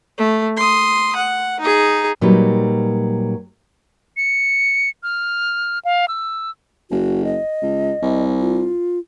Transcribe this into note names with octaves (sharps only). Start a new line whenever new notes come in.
A3
C6 D#6
F#5
D#4 G#4
A#2 F#3 G3 D#4 B4
C#7
F6
F5
E6
F#1 F#4
D#5
C#2
C2
F4